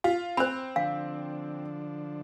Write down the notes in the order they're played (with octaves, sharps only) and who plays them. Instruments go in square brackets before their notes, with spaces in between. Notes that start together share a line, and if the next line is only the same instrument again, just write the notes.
[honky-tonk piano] F4 [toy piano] F5
[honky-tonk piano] C4 [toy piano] C5 B5
[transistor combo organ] D3 F3 D4 [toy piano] F5